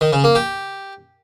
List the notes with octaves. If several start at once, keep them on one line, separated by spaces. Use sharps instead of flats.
D#3
C#3
A#3
G4